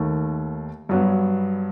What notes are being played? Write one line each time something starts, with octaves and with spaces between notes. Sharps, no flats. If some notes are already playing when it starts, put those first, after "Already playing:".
Already playing: D#2 D#3 A3
G2 F#3 B3